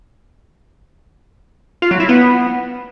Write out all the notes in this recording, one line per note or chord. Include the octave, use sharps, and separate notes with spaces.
F4
F#3
E4
B3